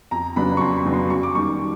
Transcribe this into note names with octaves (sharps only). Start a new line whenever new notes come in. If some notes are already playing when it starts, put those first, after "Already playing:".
F2 A#5
C#3 F#3 B3 D4 B5
C#6
F2 C6
B5
C#3 F#3 B3 D4
C6
F#2 C#6
D6
D#3 G3 C#6